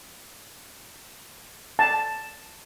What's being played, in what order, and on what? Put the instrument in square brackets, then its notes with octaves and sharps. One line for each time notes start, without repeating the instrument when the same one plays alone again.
[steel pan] A5